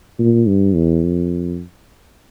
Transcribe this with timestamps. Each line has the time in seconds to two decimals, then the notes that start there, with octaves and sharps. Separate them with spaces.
0.19 A#2
0.47 G2
0.75 E2
1.03 F2